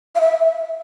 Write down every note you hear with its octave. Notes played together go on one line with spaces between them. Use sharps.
F5
E5